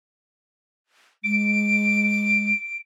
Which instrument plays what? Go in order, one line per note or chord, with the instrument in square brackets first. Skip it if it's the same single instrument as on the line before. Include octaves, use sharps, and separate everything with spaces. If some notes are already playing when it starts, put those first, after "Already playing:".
[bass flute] G#3 [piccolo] D7